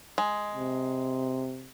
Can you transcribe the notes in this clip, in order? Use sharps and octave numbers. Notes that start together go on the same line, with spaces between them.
G#3
C3